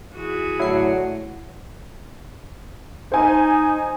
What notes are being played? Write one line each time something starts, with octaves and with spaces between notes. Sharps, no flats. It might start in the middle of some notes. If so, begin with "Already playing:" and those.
E3 F#4 G#4
A2 D3 F#3 A3 E4 C7
D#4 C5 G#5